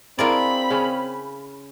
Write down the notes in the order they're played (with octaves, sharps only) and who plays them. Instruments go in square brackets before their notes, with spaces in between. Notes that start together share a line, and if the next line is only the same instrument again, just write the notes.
[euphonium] C4 [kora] D4 E4 G#4 [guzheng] F4 A#4 D5 [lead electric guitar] B5
[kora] C#3 C#4